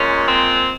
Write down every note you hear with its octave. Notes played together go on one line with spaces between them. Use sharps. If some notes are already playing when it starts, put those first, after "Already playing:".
Already playing: A#2 G#3 C#4
C4